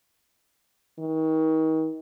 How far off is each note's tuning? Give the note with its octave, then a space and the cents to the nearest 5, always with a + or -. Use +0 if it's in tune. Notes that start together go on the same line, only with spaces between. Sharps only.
D#3 +35